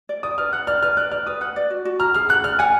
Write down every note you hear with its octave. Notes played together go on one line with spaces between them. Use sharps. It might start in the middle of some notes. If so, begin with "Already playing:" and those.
D5
D5 D#6
B4 F6
F#5 F#6
D5 F6
B4 F6
D5 F#6
D5 F6
B4 D#6
F#5 F#6
D5
F#4
F#4
A#5 F6
G#4 F6
F#5 F#6
D5 F6
F#5 G#5